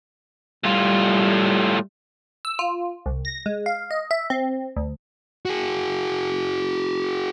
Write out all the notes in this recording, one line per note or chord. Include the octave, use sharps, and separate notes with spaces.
A2 G3 F4
E6
F4
C2
A#6
G#3
F5
D#5
E5
C4
D2
F#4 G#4